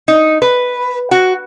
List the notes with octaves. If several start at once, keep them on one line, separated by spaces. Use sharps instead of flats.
D#4
B4
F#4